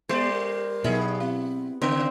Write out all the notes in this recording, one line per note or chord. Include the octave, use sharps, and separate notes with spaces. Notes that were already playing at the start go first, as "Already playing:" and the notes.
G3 B3 C5 D5
A#4
G2 B2 F#3 B3 D#4 G#4
C4 E4
C#3 C4